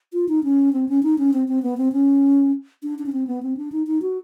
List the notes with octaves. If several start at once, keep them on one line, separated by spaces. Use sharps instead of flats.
F4
D#4
C#4
C4
C#4
D#4
C#4
C4
C4
B3
C4
C#4
D4
D4
C#4
C4
B3
C4
D4
D#4
D#4
F#4